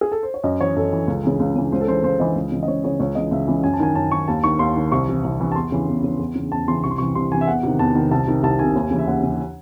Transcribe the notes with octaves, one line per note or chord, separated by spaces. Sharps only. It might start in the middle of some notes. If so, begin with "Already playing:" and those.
G#4
A4
C5
C#5
F#2 D#5
E3 C#5
F#2 A4
E3
C#2
C#3 E3
C#2
C#3 E3
C#2 C5
A4
C#3 E3 C5
C#2 C5
C#3 E3 D#5
C#2
C#3 E3
D#5
C#2 C#5
C#3 E3 C#5
C#2 C#5
C#3 E3 D#5
C#2 E5
C#3 E3
F#2 G#5
A5
D#3 G#5
F#2 A5
D#3 C#6
D#2 A5
D#3 C#6
D#2 C6
D#3
C2 C#6
C3 E3
C2
C3 E3
A5
E2 C6
C#3 E3
E2
C#3 E3
E2
C#3 E3
E2 A5
C#3 E3 C6
C2 C#6
C6
C3 E3 C#6
C2 C6
C3 E3 G#5
E5
E2 F#5
C3 D#3
E2 A5
C3 D#3
C2 A5
C3 D#3
C2 A5
C3 D#3 G#5
D#2
C#3 E3
E5
D#2 F#5
C#3 E3